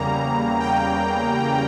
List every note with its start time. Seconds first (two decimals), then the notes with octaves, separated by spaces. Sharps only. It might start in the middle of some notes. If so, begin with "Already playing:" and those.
Already playing: E2 C#3 G3 A#3 A#5
0.59 G5